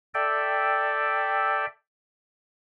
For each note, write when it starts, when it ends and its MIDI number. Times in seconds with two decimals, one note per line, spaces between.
0.14 1.66 69
0.14 1.66 74
0.14 1.66 76
0.14 1.66 79